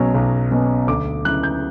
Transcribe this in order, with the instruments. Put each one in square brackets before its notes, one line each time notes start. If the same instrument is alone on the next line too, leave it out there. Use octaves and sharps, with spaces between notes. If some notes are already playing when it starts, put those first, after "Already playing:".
Already playing: [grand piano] B1 B2 F#3 C#4
B1
B2 F#3 C#4
D2 D6
C#3 F#3 C#4 E4 F#6
G6